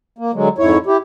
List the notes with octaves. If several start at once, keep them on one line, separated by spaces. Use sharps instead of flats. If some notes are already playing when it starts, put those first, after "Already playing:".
A#3
D3 F#3 G#3
F2 G#2 E4 C#5
E4 G4